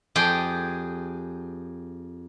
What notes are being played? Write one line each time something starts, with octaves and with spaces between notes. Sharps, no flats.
F2 G4 G#4 G5